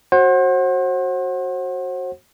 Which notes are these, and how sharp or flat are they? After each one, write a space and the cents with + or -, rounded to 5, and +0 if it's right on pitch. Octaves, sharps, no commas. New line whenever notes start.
F#4 +0 C5 +40 F#5 +0